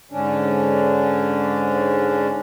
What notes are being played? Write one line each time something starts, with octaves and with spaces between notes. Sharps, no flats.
G#2 D3 C#4 D4